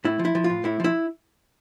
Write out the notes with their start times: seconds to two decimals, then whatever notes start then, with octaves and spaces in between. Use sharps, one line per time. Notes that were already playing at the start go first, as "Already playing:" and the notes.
0.05 A2 E4
0.19 F3
0.25 E4
0.35 F3
0.44 F4
0.50 A2
0.64 A2 E4
0.80 F3 E4